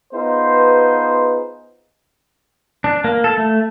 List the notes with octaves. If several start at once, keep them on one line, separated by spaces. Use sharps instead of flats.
B3 D#4 F4 G#4 B4 C5
D4
A#3
A4
A3